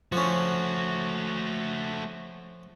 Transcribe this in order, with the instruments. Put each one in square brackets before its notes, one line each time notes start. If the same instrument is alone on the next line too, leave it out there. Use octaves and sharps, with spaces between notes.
[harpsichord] F3 C#4 [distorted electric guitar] A3 F#4